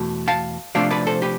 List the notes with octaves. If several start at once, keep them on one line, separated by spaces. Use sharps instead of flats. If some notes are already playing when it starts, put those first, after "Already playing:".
Already playing: E2 B2 A3
F5 A5
C3 F3 A3 D4 F4 D5 F5
B4 D5
A4 C5
G4 B4